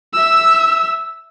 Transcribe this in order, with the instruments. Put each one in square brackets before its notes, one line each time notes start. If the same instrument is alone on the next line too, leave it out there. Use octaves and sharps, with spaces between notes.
[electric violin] E5 E6